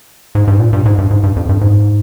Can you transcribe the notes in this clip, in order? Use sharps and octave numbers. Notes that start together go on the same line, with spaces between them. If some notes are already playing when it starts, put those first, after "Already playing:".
G#2
G2
G#2
A#2
G2
G#2
G2
G#2
G2
F2
G2
G#2